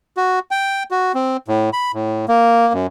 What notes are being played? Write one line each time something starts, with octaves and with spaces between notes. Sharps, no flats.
F#4
G5
F#4
C4
A2
B5
A2
A#3
F#2